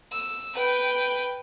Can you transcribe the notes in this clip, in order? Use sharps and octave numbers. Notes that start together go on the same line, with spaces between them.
E6
B4 G5